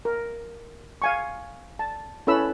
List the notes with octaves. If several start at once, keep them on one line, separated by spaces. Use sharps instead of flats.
A#4
F5 G#5 C#6
A5
C#4 E4 A4 B4 B5 E6